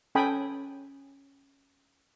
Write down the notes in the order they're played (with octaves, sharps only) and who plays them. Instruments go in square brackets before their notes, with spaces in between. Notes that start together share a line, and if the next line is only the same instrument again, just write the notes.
[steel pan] C#4 A4 G5 G#5 B5 D#6